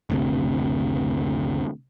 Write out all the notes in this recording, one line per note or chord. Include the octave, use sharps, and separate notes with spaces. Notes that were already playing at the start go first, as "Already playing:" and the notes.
F#1 D2 C3